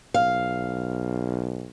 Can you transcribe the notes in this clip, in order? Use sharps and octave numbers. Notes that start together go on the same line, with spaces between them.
B1 F5